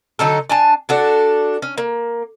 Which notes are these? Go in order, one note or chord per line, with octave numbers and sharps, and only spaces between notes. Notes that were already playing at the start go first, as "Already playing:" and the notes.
D3 F#3 D#4 A4
D4 G#5 A5
D4 F#4 A4
C#4
A#3